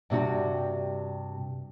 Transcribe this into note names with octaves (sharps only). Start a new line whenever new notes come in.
G2 C3 G3 F#4